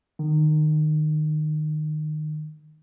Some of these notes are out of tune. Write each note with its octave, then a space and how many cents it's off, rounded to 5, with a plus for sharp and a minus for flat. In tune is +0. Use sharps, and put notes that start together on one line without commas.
D#3 -25